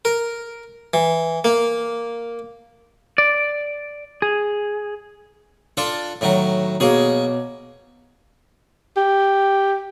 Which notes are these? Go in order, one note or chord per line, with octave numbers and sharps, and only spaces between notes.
A#4
E3
A#3
D5
G#4
D4 F4 A4
A2 D#3 F#3
B2 A#3 G#4 C#5
G4